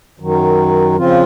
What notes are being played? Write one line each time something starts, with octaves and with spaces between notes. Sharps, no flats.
F#2 D#3 F#3
C#3 F3 C4 F4